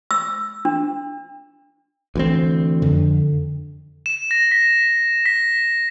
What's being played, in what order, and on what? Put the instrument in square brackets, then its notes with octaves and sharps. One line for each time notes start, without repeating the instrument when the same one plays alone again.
[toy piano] E6
D4
[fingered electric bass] D2 E3 C4
[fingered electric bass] F2 [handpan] D3
[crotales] E7
A#6
B6
B6